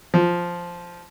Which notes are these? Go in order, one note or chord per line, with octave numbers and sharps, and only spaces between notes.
F3